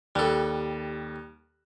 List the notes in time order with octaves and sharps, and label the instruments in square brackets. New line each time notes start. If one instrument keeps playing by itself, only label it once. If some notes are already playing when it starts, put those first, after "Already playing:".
[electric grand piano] D#2 F#6 [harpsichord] G3 A4